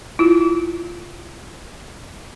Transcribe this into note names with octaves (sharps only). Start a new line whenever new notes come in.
E4 F4